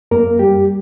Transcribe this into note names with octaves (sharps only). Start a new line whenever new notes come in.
F#2 A#3 A#4
G3 G4